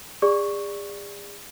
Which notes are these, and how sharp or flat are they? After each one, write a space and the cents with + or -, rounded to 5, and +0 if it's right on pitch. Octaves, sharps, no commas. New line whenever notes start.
G#4 -40 D5 +0 C#6 +0